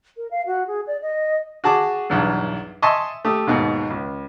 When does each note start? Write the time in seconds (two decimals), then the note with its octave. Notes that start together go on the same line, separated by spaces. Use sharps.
0.17 A#4
0.31 F5
0.46 F#4
0.67 G#4
0.87 D5
1.02 D#5
1.64 F#4 G#4 A5 D6
2.10 B1 E2 G2
2.82 D#5 E5 G#5 A5 C6 C#6
3.25 A3 G4 D#6
3.47 D#2 G#2 B2
3.90 C#2